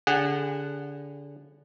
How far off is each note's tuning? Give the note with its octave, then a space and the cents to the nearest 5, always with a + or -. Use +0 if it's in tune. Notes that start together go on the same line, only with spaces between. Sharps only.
D3 -30 G#4 -40 F#5 +0